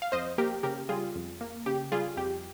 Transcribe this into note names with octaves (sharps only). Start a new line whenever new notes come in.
F5
F2 C5 D#5
A#3 G4 A#4
C#3 G4 A#4
G3 F4 G#4
F2
A#3
C#3 G4
G3 F4 G#4
F2 G4